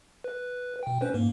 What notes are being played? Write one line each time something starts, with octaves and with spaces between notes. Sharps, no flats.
B4
B2 G5
C#4 B4 C5
G#2 A#3